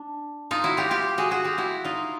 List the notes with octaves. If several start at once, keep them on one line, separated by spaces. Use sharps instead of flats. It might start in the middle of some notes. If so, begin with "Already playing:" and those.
Already playing: D4
D#4 F4
E4 F#4
F4 G4
F4 G4
F#4 G#4
F#4 G#4
F4 G4
E4 F#4
D#4 F4